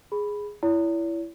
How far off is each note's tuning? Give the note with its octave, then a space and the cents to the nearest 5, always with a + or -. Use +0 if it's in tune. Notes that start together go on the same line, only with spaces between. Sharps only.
G#4 +0 B5 +0
E4 +15 C#5 +45